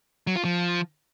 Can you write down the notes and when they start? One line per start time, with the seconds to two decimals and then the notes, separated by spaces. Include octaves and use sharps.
0.27 F#3
0.36 F4
0.45 F3